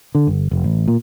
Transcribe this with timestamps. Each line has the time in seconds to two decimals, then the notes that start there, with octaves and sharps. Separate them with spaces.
0.15 D3
0.27 G1
0.51 F1
0.64 A1
0.88 A#2